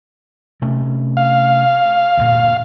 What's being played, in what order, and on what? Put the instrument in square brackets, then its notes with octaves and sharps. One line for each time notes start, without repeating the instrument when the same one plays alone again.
[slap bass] C3 A3 C#4
[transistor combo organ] F5
[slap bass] D2 G2 A#2